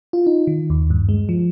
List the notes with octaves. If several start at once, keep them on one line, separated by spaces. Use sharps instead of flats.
F4
D#4
D#3
D#2
G2
G#3
F3